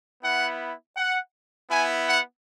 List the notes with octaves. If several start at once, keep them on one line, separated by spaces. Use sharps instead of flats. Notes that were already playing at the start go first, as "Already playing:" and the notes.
B3 E4 F#5
F#5
B3 E4 G#5
F#5